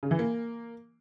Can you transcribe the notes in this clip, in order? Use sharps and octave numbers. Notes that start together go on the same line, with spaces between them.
C#3
E3
A#3